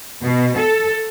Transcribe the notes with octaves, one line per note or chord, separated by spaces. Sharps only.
B2
A4